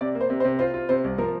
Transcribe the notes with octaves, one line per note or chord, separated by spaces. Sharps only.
C3 D5
A#3
C5
C3
C5
C3
F4 C5
F4
C3 C5
C2
F3 A#4